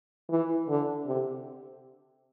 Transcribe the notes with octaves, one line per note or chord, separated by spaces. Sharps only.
E3
D3
C3